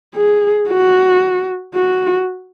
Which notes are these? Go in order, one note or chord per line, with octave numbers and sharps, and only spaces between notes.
G#4
F#4
F#4